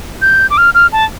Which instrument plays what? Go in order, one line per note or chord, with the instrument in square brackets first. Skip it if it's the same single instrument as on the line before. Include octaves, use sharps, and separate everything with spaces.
[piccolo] G6
D6
F6
F6
A5